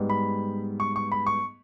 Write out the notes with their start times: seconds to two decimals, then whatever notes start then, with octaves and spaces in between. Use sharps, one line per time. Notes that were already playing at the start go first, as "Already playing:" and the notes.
Already playing: G#2 G3 B3
0.10 B5
0.80 C#6
0.96 C#6
1.12 B5
1.27 C#6